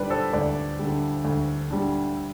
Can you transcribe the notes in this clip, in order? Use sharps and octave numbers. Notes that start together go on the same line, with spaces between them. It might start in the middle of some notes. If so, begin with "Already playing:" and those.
Already playing: D2 D3 G3 B4 D5
A4 C5
D2 B4 D5
D3 G3
D2
D3 G3